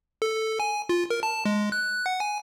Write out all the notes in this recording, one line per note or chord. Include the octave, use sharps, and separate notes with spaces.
A4
G#5
F4
A#4
A5
G#3
F#6
F#5
G#5